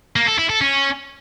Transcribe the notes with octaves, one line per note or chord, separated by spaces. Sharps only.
A#3
A4
E4
A4
C#4